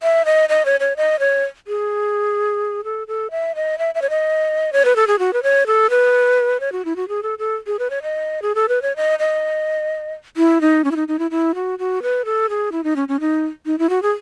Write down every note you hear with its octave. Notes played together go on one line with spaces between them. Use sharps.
E5
D#5
D#5
C#5
C#5
D#5
C#5
G#4
A4
A4
E5
D#5
E5
E5
C#5
D#5
C#5
B4
A4
G#4
F#4
B4
C#5
A4
B4
C#5
F#4
E4
F#4
G#4
A4
A4
G#4
B4
C#5
D#5
G#4
A4
B4
C#5
D#5
D#5
E4
D#4
C#4
E4
D#4
D#4
E4
E4
F#4
F#4
B4
A4
G#4
E4
D#4
C#4
C#4
D#4
D#4
E4
F#4
G#4